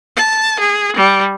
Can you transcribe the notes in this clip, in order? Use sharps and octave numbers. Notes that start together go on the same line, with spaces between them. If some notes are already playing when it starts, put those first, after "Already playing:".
A5
G#4
G3